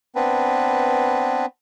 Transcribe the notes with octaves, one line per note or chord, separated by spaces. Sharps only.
B3 C4 D4 B4